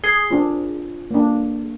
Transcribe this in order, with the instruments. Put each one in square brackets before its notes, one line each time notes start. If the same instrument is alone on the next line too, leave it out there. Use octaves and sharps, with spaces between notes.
[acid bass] G#4 [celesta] C7 G7
[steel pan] C4 D4 A#4 [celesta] F4
[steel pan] A#3 D4